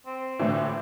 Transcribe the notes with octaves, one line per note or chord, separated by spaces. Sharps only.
C4
A2 D3 E3